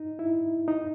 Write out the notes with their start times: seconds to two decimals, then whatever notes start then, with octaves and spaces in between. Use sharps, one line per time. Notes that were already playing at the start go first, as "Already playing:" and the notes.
Already playing: D#4
0.19 E4
0.68 D#4